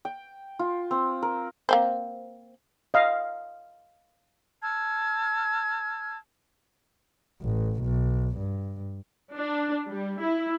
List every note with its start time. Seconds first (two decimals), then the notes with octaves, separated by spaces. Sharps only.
0.05 G5
0.59 F4
0.91 C4
1.22 A#4
1.69 A#3 C4 C5
2.94 D#5 F5
4.62 A5 E6 F6 G#6
7.42 A1
7.82 B1
8.37 G2
9.35 D4
9.90 G3
10.20 E4